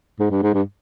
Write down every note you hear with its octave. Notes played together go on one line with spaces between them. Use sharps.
G#2
G2
G#2
G2